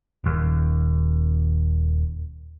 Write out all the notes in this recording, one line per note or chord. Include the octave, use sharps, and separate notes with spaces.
D#1 D#2